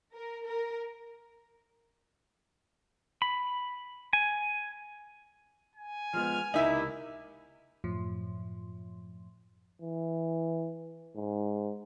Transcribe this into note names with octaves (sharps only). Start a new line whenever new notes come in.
A#4
A#4
B5
G#5
G#5
F3 G#3 B3 F6
C#2 C3 A#3 D#4 E4 E5
F#2 A2 F3
E3
G#2